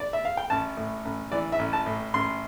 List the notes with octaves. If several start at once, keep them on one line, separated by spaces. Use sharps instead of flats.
D5
E5
F5
G5
A1 A5
A2
A1
E3 D5
E5
A1
A5
A2
A1 C6